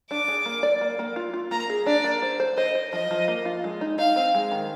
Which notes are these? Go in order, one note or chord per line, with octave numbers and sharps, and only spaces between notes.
D4 D6
G#4
A#3
D5
A#3
A#3
F4
F4
A#3 A#5
G#4
D4 D5
A#3
C5
C5
C5 D#5
C5
F3 D#5
F3
A#3
F4
G#3
D#4
D#4 F5
C4
G#3
D#3